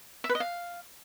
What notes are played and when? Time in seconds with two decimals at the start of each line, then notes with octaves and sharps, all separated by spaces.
0.24 E5
0.29 B4
0.35 D#5
0.40 F5